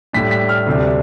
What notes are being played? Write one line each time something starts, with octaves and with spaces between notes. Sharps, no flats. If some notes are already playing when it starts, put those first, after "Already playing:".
A2 G3 D4 B6
B6
F6
D2 C3 G3 D4